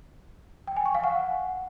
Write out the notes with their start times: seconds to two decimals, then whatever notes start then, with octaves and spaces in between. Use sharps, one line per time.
0.67 G5
0.77 G#5
0.86 C#6
0.95 F5
1.04 F#5